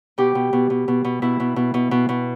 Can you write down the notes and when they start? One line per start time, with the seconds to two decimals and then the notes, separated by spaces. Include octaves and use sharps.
0.18 B2 G4
0.35 B2
0.53 B2
0.70 B2
0.88 B2
1.05 B2
1.22 B2 E4
1.40 B2
1.56 B2
1.74 B2
1.91 B2
2.09 B2